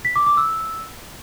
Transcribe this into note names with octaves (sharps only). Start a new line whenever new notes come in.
B6
D6
D6
E6